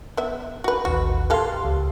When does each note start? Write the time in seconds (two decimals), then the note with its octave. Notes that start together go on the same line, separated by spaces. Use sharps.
0.17 B3 E5
0.64 F#4 B4
0.85 A1 D#2 F#4 B4
1.30 A#3 G4 A4 F5 A5 C6
1.65 C#2